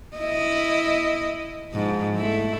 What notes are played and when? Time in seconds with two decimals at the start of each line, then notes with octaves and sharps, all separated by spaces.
0.17 E4 D#5
1.73 G#2 F3
2.16 A3 E4